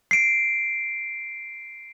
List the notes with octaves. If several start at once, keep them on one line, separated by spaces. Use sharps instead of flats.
C7 D7